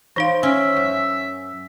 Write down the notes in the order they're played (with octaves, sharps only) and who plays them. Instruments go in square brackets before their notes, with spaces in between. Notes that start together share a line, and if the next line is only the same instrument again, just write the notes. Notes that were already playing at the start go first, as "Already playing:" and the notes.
[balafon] E3 D#4 F5 [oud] C5
[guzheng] C#4 [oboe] E5
[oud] F#2